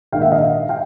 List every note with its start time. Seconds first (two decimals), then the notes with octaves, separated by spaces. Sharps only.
0.12 A#1 G#2 D#3 F5 G5
0.22 E5 F#5
0.32 D#5 F5
0.69 F5 G5